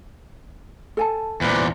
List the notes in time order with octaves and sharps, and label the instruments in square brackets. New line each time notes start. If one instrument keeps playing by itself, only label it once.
[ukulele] A4 G#5 A5
[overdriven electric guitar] E2 A#2 [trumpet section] B4 C5 D5